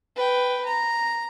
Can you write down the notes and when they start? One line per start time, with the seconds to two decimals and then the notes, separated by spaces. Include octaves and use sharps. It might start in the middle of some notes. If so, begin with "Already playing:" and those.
0.16 B4 G5
0.66 A#5